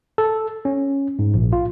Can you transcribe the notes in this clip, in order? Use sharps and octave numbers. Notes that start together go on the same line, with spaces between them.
A4
C#4
G#2
A#1
F4